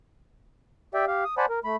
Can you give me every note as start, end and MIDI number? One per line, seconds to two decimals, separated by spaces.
0.94 1.05 67
0.94 1.05 74
0.94 1.05 76
0.94 1.05 79
1.08 1.24 67
1.08 1.24 77
1.25 1.35 87
1.38 1.46 72
1.38 1.46 74
1.38 1.46 78
1.38 1.46 80
1.38 1.46 81
1.38 1.46 83
1.49 1.59 70
1.64 1.76 57
1.64 1.76 83